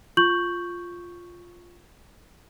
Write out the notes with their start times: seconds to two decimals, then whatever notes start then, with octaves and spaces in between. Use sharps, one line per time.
0.17 F4 C#6 G6 F#7